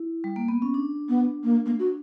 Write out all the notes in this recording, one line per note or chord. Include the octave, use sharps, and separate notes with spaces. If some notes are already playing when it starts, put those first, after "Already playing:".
Already playing: E4
G3
A#3
B3
C#4
D4
B3
A#3
A#3
F#4